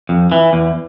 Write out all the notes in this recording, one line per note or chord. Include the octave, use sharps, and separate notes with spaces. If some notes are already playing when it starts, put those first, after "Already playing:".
F2
E3
E2